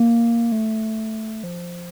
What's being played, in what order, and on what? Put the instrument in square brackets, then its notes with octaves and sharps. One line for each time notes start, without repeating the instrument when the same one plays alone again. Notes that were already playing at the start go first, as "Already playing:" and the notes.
Already playing: [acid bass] A#3
A3
F3